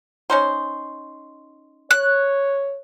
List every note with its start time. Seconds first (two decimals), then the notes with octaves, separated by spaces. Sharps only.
0.30 C#4 D#4 C5
1.91 C#5 F#6